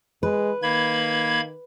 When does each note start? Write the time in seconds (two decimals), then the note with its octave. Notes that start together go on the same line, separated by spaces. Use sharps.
0.23 G#3 B4
0.63 D#3 A#3 B5 G#6